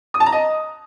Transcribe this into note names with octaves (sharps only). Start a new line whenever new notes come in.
D#6
A5
A#5
D#5